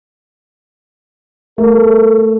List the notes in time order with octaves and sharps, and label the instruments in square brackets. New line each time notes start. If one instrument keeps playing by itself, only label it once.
[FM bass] A3 [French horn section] A4 [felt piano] A#4